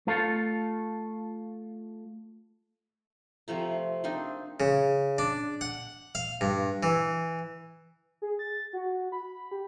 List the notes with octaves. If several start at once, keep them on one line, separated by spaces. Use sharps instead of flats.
A3 F4 A4 F5
C3 F3 A3 A#5
A#3 C4 D4 D#4
C#3
D4
F#5
F5
G2
E3
G#4
A6
F#4
B5
G4